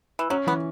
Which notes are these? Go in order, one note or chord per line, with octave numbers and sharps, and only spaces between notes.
E3
F#3 C#4
E3 B3